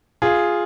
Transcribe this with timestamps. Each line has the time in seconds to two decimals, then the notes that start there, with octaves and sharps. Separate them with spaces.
0.22 F4 G#4